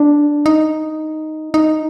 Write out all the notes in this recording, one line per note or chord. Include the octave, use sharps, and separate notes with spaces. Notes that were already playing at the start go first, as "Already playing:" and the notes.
Already playing: D4
D#4
D#4